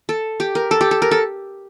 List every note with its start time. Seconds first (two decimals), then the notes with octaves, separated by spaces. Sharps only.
0.09 A4
0.40 G4
0.55 A#4
0.71 A4
0.81 G4
0.91 A4
1.02 A#4
1.11 A4